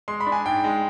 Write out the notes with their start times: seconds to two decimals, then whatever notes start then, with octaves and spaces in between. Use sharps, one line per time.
0.08 G#3 C6
0.20 B5
0.26 D4
0.32 G#5
0.45 G#2 G5
0.64 G#3